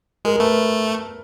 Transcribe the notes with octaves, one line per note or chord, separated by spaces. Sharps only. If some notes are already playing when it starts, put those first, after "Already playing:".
G#3 A#4
A#4
A3 B4